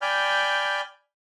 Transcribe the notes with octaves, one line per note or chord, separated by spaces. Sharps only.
D5 G5 G#5 B5 F6 G6